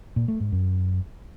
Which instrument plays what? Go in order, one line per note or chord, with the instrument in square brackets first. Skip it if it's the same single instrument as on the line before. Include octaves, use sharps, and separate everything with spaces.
[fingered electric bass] A#2
A3
G#2
F#2